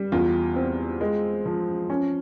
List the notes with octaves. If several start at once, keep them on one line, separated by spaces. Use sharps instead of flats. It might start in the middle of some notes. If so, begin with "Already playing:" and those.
Already playing: G3
E2 F4
C4
G#3
F3
C#4